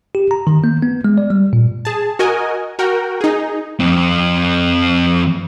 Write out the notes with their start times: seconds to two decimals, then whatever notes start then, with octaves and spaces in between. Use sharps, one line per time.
0.15 G4
0.31 A#5
0.47 D#3
0.64 A#3
0.82 B3
1.05 G#3
1.18 D5
1.30 G3
1.53 A#2
1.85 G#4 A5
2.19 F#4 A#4 D#5 G#5
2.79 F#4 A#4 G5
3.21 D#4 G#4
3.80 F2 C4